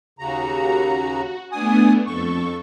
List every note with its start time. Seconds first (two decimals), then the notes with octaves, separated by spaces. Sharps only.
0.19 D#2 C#3 F#4 A#5
1.52 A3 B3 D4 G#5 D#6
2.07 F2 A4 C#6